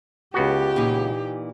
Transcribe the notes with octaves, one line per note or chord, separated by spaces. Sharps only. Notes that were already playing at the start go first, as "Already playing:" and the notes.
C#2 B3 F#4 G4
A#2 E3 D#4